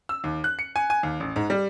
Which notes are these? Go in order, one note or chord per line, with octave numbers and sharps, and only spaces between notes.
E6
D#2
F#6
C#7
G#5
G#5
D#2
A1
G#2
G3